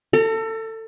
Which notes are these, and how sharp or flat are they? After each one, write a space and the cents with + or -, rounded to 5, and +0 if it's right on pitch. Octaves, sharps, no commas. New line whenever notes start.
A4 +25 A#5 -35